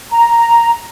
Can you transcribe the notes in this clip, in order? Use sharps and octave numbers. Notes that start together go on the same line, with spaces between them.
A#5